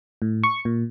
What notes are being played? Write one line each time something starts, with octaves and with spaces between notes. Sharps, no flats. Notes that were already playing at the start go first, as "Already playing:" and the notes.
A2
C#6
A#2